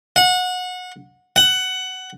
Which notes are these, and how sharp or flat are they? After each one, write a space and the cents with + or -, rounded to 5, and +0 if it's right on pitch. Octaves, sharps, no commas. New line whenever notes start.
F#5 -25
F#5 +15